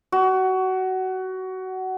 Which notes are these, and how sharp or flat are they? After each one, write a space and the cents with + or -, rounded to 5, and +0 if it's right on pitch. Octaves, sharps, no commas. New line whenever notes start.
F#4 +20